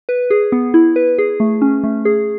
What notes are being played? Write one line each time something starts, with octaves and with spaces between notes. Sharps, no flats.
B4
G#4
B3
E4
B4
G#4
A3
C#4
A3
G#4